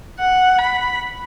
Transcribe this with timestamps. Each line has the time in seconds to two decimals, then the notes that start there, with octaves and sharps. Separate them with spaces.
0.19 F#5
0.59 B5